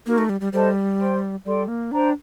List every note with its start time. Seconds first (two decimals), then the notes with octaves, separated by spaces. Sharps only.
0.06 A#3 D#4 F#4 A#4
0.18 A3
0.29 G3
0.41 G3
0.52 G3 A4 C5 D#5 A5
0.99 C5 G5 C6
1.45 G3 A4 D5 G5 C6
1.68 A#3
1.91 D4 C5 G5 A#5